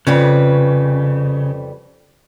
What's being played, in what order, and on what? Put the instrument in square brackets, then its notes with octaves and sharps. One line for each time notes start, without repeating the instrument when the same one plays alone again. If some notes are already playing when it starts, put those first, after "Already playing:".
[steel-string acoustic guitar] F2 G3 B4 [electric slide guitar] C#3